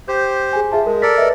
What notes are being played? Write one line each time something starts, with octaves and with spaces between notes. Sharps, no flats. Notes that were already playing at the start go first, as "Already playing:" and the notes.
G4 C5 G6
G#4 G#5
F4 G#4 E5 A5
G#3 A#4
A4 A#4 D5 B6
B4 D#5 E5